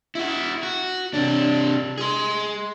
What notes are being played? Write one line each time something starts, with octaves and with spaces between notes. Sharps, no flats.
E4 F#4
F#4
C3 D4
G#4 C6